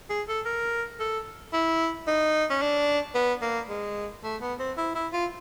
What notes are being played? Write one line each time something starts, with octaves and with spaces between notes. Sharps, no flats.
G#4
A4
A#4
A4
E4
D#4
C#4
D4
B3
A#3
G#3
A3
B3
C4
E4
E4
F4